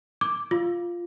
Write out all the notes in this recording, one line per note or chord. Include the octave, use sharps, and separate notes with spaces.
D6
F4